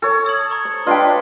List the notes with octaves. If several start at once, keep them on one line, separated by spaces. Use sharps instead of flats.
A4 C#5
D#6 G#6 F#7
A#5 C#6 G#6
C5
D4 F4 B4 D#5 G5 C6 C7